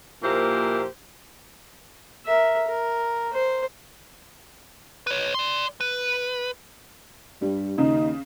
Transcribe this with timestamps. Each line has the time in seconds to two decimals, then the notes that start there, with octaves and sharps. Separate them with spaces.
0.24 A#2 F3 A#3 E4 G4 C5
2.26 A#4 E5
2.67 A#4
3.33 C5
5.07 B4 C#5
5.34 D5 C6
5.81 B4
7.42 G2 G3
7.78 D#2 C#3 D#4